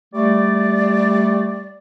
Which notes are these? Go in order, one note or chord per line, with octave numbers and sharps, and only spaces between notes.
G3 A3 D5